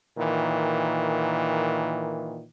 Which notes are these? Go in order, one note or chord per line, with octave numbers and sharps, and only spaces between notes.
A#2 D#3 E3